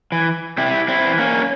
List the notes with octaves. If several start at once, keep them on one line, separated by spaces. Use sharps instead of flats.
E3
C3 E4 G4
C4 E4
E3
A#3 C#4